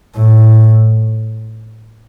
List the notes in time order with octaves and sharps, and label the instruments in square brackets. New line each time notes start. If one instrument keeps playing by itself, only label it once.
[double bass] A2